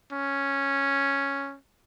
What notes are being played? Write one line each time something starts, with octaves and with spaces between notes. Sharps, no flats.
C#4